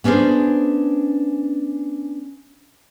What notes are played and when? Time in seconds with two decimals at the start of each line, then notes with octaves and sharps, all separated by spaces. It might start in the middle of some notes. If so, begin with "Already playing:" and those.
0.04 B3 C#4 D4 G#4 C5